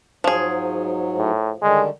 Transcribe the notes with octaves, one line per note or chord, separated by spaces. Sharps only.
G#2 F3 F#3 G#4
A2
D3 D#3 G3 G#3